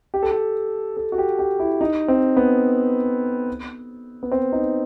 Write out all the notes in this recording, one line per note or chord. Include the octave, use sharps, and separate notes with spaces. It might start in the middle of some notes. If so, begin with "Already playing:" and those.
G4
A4
G4
A4
F#4
G4
G4
E4
D#4
C4
B3
B3
C4
D#4